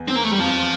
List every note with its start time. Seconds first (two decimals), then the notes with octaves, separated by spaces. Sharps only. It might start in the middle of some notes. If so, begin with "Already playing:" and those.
Already playing: E2
0.08 C4
0.15 A#3
0.24 A3
0.31 G3
0.39 F2 F3